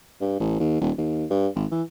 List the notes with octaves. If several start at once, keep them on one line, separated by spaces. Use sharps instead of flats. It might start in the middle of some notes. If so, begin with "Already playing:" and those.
G2
A1
D#2
D#1
D#2
G2
G#1
E3